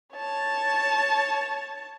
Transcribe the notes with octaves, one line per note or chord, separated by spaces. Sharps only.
C#5 A5